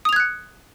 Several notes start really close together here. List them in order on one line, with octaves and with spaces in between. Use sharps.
D#6 F7 G#6 F#6 C#7